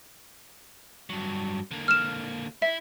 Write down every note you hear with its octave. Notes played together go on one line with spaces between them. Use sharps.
G2 F#3
D3 A#3
F6 E7
E4 E5